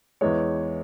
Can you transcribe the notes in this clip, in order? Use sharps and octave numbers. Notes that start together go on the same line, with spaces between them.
E2 E3 G#3 C#5